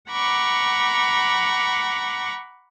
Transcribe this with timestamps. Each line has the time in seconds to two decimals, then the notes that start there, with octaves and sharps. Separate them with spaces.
0.11 F#5 A#5 B5 C#6 D6